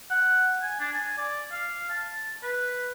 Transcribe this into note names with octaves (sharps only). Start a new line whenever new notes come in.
F#5
G#5
D4
G#5
D5
F5
A5
B4